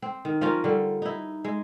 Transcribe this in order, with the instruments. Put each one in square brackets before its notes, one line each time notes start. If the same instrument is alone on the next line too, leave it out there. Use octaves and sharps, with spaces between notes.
[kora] C4
D#3
F3 C#4 F4 A#4
D3 G3
D#4 E4
G#3